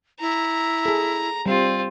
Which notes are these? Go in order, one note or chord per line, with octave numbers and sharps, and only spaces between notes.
E4 A#5
G#4 A4
G3 C4 F4